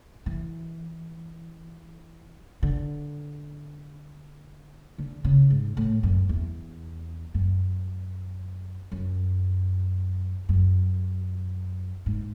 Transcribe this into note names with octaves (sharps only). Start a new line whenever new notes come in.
E3
D3
D3
C#3
G#2
A2
F#2
E2
F#2
F#2
F#2
G#2